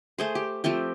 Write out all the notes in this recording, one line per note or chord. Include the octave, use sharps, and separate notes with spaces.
A3 G#4 C5
G4
F3 A3 C4 G4